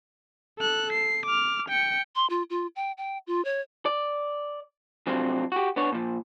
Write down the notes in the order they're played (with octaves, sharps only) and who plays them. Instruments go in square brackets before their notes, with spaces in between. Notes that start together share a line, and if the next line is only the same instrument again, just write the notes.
[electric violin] A4 F#6
C7
D6 F6
G5 C#7
[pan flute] C6
F4
F4
G5
G5
F4
C#5
[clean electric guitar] D5
F2 C3 F#3 C4 D4 F4
F#4 G4
B3 D4 C#5
A#2 F3